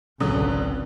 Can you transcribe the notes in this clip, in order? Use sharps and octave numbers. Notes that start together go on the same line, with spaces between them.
G#1 C#2 D3 F#3 D#6